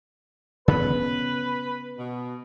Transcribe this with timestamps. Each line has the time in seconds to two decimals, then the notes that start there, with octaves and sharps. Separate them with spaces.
0.68 C#3 B3 B4
1.98 B2